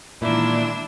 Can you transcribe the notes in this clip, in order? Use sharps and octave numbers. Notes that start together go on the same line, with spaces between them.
A#2 D#3 E3 G#3 D4 E4 E7